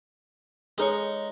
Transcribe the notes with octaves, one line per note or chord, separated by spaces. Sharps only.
G#3 D#4 A4 B4 C#5 C#6